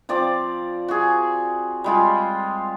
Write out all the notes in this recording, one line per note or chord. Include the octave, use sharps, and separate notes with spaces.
F3 C4 D5
F#4 G#4
G3 G#3 F4